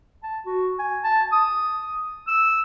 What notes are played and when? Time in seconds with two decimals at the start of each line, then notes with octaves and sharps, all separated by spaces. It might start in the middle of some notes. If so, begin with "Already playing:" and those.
0.23 A5
0.46 F#4
0.79 G#5
1.04 A5
1.32 D#6
2.28 E6